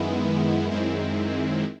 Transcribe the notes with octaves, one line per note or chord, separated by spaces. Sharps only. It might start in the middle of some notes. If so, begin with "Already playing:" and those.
Already playing: F#2 D#3 G#3 B3 E4
F#2 D#3 G#3 C4 E4